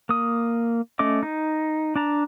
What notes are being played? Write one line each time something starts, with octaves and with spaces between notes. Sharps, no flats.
A#3 D#6
A3 C#4 D#5 D6
D#4
D4 A5 A#5